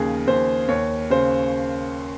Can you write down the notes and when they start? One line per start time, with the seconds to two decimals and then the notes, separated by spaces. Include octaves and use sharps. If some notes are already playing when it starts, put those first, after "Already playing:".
Already playing: D#2 C#3 F3 G#4
0.27 D#2 C5
0.68 D#2 C#5
1.10 C#3 C5